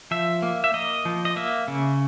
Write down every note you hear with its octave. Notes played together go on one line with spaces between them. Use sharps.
F3 E5
A#3
E5
A#3 D#5
F3
D#5
A#3 E5
C#3